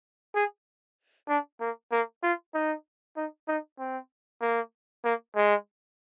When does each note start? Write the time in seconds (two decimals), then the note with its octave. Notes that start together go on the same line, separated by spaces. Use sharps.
0.35 G#4
1.28 D4
1.61 A#3
1.92 A#3
2.23 F4
2.54 D#4
3.16 D#4
3.48 D#4
3.79 C4
4.41 A#3
5.05 A#3
5.36 G#3